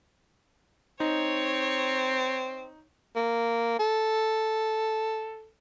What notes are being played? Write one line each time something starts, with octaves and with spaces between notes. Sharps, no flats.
C4 D#4 C#5
A#3
A4